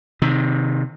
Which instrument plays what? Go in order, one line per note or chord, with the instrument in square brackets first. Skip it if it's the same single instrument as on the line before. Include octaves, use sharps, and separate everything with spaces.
[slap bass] C3 D#3